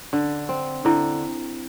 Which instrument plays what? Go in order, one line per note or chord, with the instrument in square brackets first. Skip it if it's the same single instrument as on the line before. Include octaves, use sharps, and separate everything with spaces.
[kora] D3
C4
[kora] D3 [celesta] E4